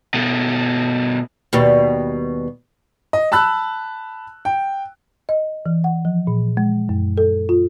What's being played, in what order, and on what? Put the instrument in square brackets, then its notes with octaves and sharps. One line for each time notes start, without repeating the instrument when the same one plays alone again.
[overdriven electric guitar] B2 A3
[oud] D#2 B2 G3
[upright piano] D#5
A5 B5 E6 F#6
G5
[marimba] D#5
E3
F#5
F3
A#2
G#3
F#2
A4
F4